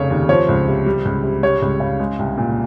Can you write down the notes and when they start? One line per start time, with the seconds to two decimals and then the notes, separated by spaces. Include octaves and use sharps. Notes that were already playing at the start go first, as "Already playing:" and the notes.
Already playing: F1 C#3 C#5
0.11 D#2
0.29 F3 C#5
0.48 C#2
0.67 C3
0.86 G3
1.05 C#2
1.23 C3
1.43 G3 C#5
1.62 C#2
1.80 C#3
2.00 G#3
2.19 C2
2.37 A#2